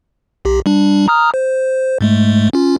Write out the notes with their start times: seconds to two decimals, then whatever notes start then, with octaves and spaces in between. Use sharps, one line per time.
0.45 B1 G4
0.66 G3 D4
1.08 A#5 D#6 F6
1.34 C5
2.01 G#2 G#3 A3
2.53 C#4 F4